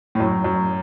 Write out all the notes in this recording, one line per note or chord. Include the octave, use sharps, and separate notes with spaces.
A2
F#2
F#2